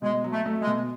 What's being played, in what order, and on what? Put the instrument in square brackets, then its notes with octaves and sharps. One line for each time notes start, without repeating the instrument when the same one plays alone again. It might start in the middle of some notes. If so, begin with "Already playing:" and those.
[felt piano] B2 [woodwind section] G#3
[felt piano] F#3
[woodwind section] A3
[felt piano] A3
[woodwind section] G#3
[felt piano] B2